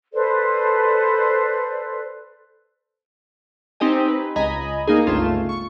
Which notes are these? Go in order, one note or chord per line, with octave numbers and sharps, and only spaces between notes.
A4 B4 C5 D5
C4 D#4 G4 D#5 G#5
B4
C#2 D#5 G#5 A#5 B5
A#3 D#4 G#4
G1 C#2 A3 F4 E7
C#6